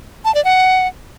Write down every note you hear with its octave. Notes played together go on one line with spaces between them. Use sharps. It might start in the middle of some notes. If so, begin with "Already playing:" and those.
A5
D5
F#5